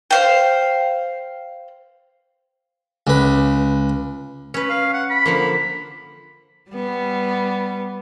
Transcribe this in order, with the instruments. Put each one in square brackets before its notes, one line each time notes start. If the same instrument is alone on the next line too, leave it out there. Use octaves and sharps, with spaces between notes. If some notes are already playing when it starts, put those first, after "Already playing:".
[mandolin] C5 F5 G5
[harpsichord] C#2 B4
[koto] C#4 B4
[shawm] F5
F#5
B5
[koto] D3 F3 A#3
[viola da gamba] G3 B3